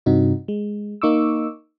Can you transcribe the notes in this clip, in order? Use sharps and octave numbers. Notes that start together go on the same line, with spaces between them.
G2 C3 C4 D#4 F#4
G#3
A#3 D#4 C#6 D6 E6